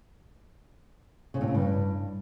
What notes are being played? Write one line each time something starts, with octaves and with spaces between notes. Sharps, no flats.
C#3
A2
C#3
G2